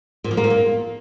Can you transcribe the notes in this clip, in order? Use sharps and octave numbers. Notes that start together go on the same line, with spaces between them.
A#2
F3
A#3
A#2
A#3